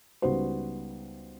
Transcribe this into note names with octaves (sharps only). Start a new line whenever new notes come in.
C#2 G3 B3 D#4 F#4 C5